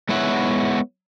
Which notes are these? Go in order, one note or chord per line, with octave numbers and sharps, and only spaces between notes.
G#3 B3 E4 C#5 E5 F#5